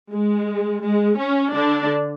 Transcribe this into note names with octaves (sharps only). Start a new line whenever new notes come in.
G#3
G#3
C#4
D3 D4